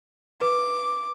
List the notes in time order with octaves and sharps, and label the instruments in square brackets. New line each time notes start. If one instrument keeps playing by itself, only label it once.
[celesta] B4 [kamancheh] D6